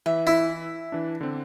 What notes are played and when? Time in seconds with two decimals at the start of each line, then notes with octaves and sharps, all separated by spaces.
0.06 E3 E5
0.27 E4
0.92 E3 D4
1.21 D3 C4